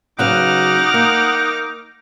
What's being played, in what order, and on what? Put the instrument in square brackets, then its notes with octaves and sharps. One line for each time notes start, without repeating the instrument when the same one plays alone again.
[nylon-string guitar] C#3 F#3 B4 [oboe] D#4 [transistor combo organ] F#5 [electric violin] D6 F6
[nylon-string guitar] A#3